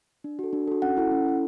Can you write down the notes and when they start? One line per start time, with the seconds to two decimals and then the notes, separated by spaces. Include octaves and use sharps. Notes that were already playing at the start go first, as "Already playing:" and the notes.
0.24 D4
0.39 F#4 A4
0.53 D4
0.68 F#4 A4
0.82 C#4 F#5
0.97 E4 A4
1.11 C#4
1.26 E4 A4